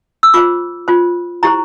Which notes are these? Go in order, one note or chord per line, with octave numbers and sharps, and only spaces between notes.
E6
F4 C5 D6
F4 C5
E4 G4 C5 A#5